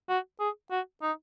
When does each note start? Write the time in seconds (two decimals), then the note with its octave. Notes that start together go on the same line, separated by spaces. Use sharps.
0.09 F#4
0.40 G#4
0.71 F#4
1.02 D#4